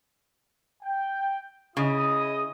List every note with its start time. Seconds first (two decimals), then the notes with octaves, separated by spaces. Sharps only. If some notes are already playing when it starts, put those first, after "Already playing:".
0.82 G5
1.77 C#3 E4 D#5 D#6